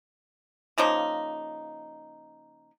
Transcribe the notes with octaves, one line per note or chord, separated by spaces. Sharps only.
C#3 F3 A#3 D#4